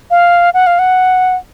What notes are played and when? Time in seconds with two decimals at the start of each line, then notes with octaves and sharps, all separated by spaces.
0.11 F5
0.54 F#5
0.67 F5
0.79 F#5